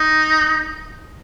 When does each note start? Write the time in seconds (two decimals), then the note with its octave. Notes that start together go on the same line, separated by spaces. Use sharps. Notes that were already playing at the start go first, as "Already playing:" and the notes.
Already playing: D#4